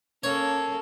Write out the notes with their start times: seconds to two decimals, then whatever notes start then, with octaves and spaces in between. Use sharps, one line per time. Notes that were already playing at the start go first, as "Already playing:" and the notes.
0.23 A#3 C#4 A4 C#5